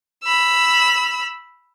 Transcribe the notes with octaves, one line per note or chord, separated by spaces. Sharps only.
B5 E6